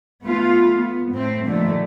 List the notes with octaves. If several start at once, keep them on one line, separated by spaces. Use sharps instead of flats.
A3 B3 F4
B3
A2 A3 C4
A#2 D3 D#3 F3 G3 A3